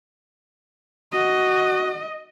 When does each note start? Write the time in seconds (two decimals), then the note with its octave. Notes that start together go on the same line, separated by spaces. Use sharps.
1.12 F#4 D#5